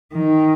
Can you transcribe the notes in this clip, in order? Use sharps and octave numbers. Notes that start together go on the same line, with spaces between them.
D#3